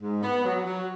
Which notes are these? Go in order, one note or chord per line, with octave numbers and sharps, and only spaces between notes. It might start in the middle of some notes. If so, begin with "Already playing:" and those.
G#2
B3
F#3
F#3